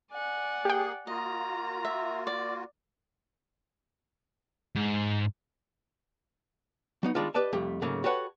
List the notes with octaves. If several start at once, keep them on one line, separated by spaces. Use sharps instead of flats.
D5 F#5 G#5
A#3 G4 G#4 G5
A#3 F4 F#4 D#5 A#5
E5
D5
G#2
F#3 B3 D#4
D#3 G3 G#3 D4 F4
G4 B4 D5 D#5 A5
C2 F2 A3 G4
G#2 C#3 F#3 A3 A#3
F#4 G4 A4 B4 C#5 F#5